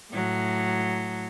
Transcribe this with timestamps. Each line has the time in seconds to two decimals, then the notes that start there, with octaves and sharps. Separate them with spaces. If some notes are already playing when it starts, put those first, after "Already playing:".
0.11 A2 F#3